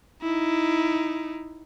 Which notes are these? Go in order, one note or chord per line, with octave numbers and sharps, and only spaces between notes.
D#4 E4